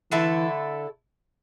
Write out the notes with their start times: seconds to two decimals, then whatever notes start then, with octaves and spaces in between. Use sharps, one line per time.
0.11 D3 E3 A3 E4 A4